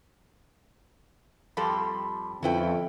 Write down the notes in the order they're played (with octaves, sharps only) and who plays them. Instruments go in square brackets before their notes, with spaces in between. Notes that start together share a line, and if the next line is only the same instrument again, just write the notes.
[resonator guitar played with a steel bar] F2 G3 A4 [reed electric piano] B5 C6 D6
[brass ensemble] F2 [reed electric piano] D3 B4 [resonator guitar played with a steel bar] C#4 E4 G5